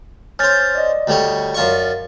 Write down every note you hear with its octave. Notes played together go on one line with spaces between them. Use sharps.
C#4 C5 F6 G6 A6
D5 D#5
D2 G3 C#5
F#2 F4 C#6